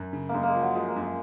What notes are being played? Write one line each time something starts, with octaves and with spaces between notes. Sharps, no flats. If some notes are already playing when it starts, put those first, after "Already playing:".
Already playing: F#2
C#3
F#2 G#3 A#3
G#3 A#3
F3
F#3
F3 G#3
A#3
F#2
G#3